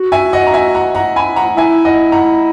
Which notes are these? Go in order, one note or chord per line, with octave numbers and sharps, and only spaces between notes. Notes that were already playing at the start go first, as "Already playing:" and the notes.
Already playing: F#4
E5 G#5
D#5 F#5
A#5
E5 G#5
F#5 A#5
F#5 A#5
G#5 B5
F#5 A#5
E4 E5 G#5
D#5 F#5
F#5 A#5